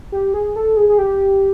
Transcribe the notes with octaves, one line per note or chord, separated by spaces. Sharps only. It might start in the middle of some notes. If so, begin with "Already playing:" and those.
G4
G#4
A4
G#4
G#4
G4